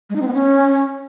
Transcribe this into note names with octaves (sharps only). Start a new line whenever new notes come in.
G#3
D#4
C4
B3
C#4